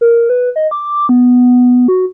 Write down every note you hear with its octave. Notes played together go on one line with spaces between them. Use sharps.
A#4
B4
D#5
D6
B3
F#4